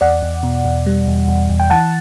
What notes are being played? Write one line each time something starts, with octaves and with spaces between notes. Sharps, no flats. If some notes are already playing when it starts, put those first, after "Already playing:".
E2 D5 F#5
E2
B2
E2
G3
E2
E2
E2
G5
E3 F#5 A5